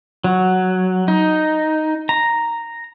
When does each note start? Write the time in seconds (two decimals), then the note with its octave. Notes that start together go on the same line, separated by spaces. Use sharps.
0.24 F#3
1.08 D#4
2.09 A#5